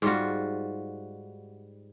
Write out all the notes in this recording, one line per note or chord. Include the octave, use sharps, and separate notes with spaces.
G#2 G3 F4 F#4